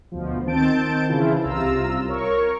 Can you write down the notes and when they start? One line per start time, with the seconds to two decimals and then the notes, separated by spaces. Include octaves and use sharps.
0.12 D2 B2 F3
0.47 D#3 C4 A5 G6 D7
1.09 C#3 E3 E4 F4
1.42 C2 C3 F4 A#5 E6
2.08 A#4 C#5 C#6